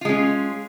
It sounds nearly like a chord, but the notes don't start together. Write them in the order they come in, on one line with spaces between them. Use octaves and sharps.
F4 G#3 C#4